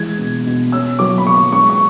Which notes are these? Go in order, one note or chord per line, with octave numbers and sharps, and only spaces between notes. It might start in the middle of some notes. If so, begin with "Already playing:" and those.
Already playing: E3 G#3 G#6
B2
B2
C#4 E6
F#3 D6
B5
F#3 C#6
G#3 C#6
C#6